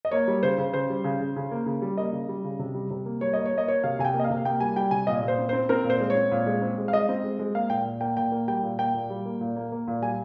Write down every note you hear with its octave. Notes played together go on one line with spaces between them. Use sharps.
D#5
A#3 C#5
G3
C#3 C5
C#3
C#3 C5
G3
C#3
C#3
C#3
A#3
C#3
G3
A#3 D#5
C#3
G3
C#3
C3
G3
C3
A#3
G3 C#5
A#3 D#5
C#5
A#3 D#5
A#3 C#5
C3 F5
C3 G#5
G5
A#3
D#5
F5
C3
A#3 G5
G3 G#5
G3 G5
C3 G#5
A#2 D#5
A#2
C5
C4
C4 C5
C4 A#4
A#2
C5
G#3
C#5
C4
A#2
G#3
C4
G#3
F5
G#3 D#5
C4
G#3
G#3
A#3 F5
A#2 G5
A#2
A#3 G5
A#2 G5
A#3
G3 G5
A#2
A#3 G5
A#2
G3
A#3
A#2
A#3
A#3
A#2
G3 G#5